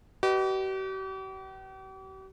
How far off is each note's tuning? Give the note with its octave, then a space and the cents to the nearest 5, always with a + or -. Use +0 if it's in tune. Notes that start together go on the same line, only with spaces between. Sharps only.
G4 -45 B4 +0 D#5 -25